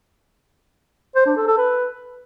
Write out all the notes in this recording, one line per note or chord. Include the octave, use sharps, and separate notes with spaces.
C5
D4
A4
A4
B4